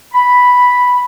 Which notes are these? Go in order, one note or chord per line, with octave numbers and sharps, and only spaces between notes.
B5